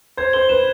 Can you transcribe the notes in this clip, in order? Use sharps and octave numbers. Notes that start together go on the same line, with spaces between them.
C5 G#6
C5 G7
B4 E7